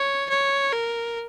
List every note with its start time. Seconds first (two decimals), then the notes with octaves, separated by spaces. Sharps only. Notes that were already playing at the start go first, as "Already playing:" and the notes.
Already playing: C#5
0.29 C#5
0.73 A#4